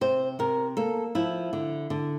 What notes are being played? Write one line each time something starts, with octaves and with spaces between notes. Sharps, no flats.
C3 C5
C3 A#4
A#3 A4
F3 E4
D3
D3